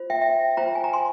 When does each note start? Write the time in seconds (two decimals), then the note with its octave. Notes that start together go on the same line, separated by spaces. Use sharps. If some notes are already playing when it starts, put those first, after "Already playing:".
Already playing: F4 C5
0.10 E5 G5
0.21 E5 G5
0.57 F4 C5 G5 A#5
0.75 G#5
0.84 A#5
0.93 G#5 C6